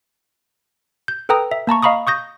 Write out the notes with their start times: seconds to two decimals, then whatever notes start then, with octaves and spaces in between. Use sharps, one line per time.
1.08 G6
1.29 A4 B4 G5 A#5 D#6
1.51 E5
1.67 A#3 A5 A#5 C#6
1.83 D#5 F5 A#5 B5 C#6 D#6
2.07 C#6 D#6 G6 A#6